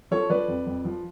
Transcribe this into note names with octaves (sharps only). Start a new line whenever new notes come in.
F3 A4 C#5
F3 B4 D5
F2
F2
F3